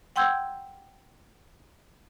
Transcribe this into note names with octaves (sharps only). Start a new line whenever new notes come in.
F#5 G5 C6 E6 G6 G#6